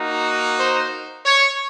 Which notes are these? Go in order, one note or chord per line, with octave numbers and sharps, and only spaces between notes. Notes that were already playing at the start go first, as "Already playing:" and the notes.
Already playing: A#3 D#4 F#4
C5
C#5